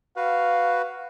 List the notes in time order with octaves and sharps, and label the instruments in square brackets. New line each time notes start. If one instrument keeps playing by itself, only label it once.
[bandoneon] F#4 B4 [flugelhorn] F5